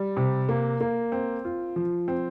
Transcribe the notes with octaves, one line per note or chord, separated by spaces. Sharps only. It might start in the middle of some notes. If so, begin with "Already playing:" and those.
Already playing: G3
C3
A#3
A#3
C4
F4
F3
C4